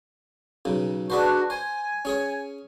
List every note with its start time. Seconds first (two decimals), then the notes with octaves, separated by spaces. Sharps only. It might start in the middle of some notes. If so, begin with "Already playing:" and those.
0.65 B1 C#3
1.10 D4 F#4 G#4 B4 C5
1.50 C5 G#5
2.05 C#4 G#4 C#5